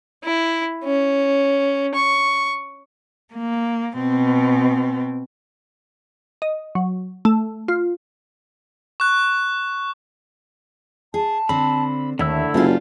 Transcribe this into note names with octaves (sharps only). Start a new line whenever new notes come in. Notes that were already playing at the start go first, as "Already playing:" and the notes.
E4
C#4
C#6
A#3
B2 C4
D#5
F#3
A3
F4
C#6 F#6
G#4 A5
D3 C4 B5
D#2 D3 A3 E4 E6
F#1 G3 F4